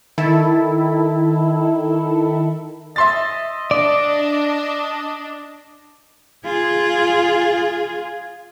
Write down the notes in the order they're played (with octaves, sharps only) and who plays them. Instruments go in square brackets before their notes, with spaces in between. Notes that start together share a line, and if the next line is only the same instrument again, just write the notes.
[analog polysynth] D#3 E4 A4
[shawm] D#5 [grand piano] E5 C6 A6
[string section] D4 [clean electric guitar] D5
[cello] F4 G#4